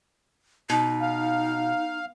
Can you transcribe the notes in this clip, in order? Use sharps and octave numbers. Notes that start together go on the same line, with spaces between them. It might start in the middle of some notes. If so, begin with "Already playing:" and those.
B2 D#4
F5